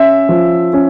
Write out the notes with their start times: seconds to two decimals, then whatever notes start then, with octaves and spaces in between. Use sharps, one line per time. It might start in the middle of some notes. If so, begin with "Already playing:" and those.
Already playing: C#4 E5
0.29 F3
0.73 C#4